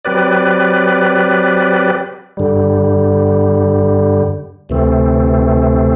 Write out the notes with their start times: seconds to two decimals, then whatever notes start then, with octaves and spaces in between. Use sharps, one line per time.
0.05 F#3 C4 G4 B4 D5
2.37 G2 D3 G3
4.69 D2 C3 E3 A3 C4